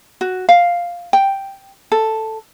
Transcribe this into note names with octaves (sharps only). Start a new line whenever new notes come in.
F#4
F5
G5
A4